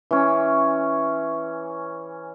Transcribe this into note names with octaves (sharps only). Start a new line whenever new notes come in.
E3 C#4